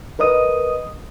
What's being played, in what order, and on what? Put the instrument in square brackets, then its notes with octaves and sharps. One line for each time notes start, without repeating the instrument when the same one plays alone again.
[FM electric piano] A#4 B4 D#5 D#6